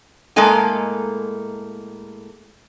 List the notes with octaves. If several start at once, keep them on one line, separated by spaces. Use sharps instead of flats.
A2 G#3 A#3 A4 D#5 G#5